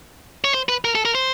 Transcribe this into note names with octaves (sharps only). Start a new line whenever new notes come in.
C#5
C5
B4
A#4
A4
A#4
C5